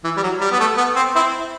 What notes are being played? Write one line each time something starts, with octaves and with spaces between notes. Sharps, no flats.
E3
G3
F#3
G3
B3
A3
B3
C4
C4 E4